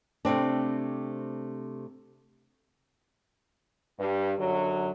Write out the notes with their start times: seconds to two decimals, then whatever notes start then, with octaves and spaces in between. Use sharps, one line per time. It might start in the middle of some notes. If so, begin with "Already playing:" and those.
0.25 C3 A3 C4 D4
3.99 G2
4.38 F#2 D3 F#3